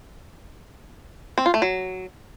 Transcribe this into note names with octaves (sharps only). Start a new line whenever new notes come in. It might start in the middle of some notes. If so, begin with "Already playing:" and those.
C4
F4
A3
F#3